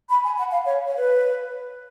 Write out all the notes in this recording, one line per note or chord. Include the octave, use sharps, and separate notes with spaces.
B5
G#5
F#5
F5
C#5
C#5
B4